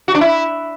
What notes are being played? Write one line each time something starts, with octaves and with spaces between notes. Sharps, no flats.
F#4
D4
E4